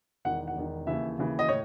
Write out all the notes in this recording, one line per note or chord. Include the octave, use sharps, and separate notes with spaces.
E1 E2 D#3 F#5
F#5
E1 E2 D#3
D#2 C#3 E3 E5
D#2 C#3 E3
D#5
A2 C#5